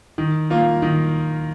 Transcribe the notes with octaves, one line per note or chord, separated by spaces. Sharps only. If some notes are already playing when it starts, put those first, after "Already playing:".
D#3
A#3 F4
D#3